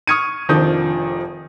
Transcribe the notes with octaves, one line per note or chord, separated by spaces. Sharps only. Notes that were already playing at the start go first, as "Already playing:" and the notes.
C#6 D#6 F6 G#6 C#7 D#7
F1 D#3 F3 D4 D#6 G6